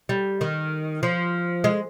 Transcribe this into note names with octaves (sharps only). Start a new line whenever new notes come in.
G3
D#3
F3
G#3